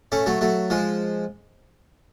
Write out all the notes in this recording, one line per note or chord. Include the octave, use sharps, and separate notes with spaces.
A3 C#4
F#3 A3
F#3 A3
F3 G#3